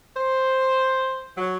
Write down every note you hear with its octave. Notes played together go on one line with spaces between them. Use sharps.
C5
F#3